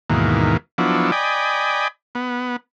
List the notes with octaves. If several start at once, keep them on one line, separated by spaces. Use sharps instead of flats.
D#2 G#2 B2 E3 A#3
F3 F#3 B3 D4 E4
D5 D#5 G5 G#5 B5
B3